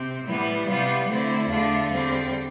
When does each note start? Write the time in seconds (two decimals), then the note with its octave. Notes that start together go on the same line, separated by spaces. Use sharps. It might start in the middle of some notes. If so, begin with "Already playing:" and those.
Already playing: C3 C4
0.25 A2 E3 G3 B3 E4
0.66 C3 G3 B3 F4
1.08 D3 A3 C4 E4
1.49 E2 D3 A3 D4 F4
1.91 E2 D3 G3 C4